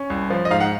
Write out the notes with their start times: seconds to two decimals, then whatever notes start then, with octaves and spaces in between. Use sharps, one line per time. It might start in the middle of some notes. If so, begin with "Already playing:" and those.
Already playing: C#4
0.10 C2
0.30 F3
0.45 D#5
0.51 G#2 F5
0.60 F#5